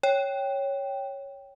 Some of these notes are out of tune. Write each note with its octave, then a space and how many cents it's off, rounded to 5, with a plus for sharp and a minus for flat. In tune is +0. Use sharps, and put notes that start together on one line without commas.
C#5 +0 G5 +0